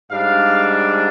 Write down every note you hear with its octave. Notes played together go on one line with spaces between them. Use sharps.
G#2 G3 D4 F5